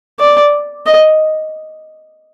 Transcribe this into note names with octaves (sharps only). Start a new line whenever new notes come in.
D5
D#5